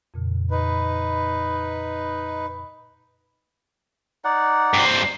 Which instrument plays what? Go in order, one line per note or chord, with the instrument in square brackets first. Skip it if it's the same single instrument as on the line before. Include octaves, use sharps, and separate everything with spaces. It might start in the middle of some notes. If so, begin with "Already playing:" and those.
[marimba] F2 A#2 C#3
[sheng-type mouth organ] D#4 B4
[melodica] D#4 D5 F#5
[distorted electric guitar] G2 C4